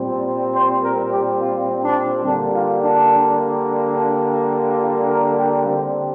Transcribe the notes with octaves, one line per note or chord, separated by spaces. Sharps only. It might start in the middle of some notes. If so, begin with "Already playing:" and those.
Already playing: A#2 G3 C4
C5
A#4
G4
F4
D4
D3 G3 A#3 D4
F4
D4
D4
F4
A#4
G4
D3 G3 C4 G4